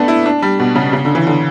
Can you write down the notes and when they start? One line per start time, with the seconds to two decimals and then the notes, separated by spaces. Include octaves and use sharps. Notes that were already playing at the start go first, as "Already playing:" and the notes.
Already playing: A3 B3 D4
0.08 E4
0.26 D4
0.42 G3
0.60 B2
0.75 C#3
0.93 C#3
1.05 D3
1.15 E3
1.27 D3